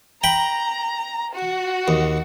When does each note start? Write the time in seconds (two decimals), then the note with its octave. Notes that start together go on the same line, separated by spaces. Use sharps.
0.24 G5 A#5 B5
1.33 F#4
1.88 D#2